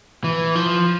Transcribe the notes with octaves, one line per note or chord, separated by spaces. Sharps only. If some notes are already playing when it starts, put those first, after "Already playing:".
E3
F3